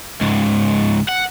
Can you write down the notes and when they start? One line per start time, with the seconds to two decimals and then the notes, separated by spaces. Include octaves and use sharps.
0.21 C#2 G#2
1.09 F#5